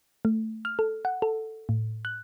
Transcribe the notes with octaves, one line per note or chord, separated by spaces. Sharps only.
A3
F6
A4
F#5
A4
A2
F#6